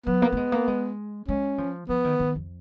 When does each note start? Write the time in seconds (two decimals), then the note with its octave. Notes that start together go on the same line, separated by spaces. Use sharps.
0.07 F#3 B3
0.22 A#3
0.32 A#3
0.37 G#3
0.52 A#3
0.68 G#3
1.28 G#3 C#4
1.58 F3
1.89 F3 B3
2.04 D#3
2.19 D#3
2.35 F2